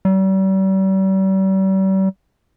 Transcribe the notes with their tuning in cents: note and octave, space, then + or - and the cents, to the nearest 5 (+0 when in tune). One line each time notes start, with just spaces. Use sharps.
G3 -40